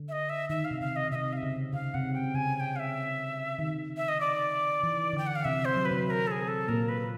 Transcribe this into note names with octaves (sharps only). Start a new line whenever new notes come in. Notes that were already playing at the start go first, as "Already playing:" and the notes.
Already playing: D3
E5
D#5
E5
D#3 E5
F5
C3
C#3 F5
D#5
C3 D#5 E5
F5
E5
C#3
C#3 F5
C3 F#5
C#3 G5
C#3 G#5
G#5
G5
F5
E5
D#3
E5
D#5
D5
E3
D3 G5
F#5
F5
C3 E5
C5
F#3
B4
C3 C4
B4
A#4
A4
G#4
A4
A#2 A#3 A#4
B4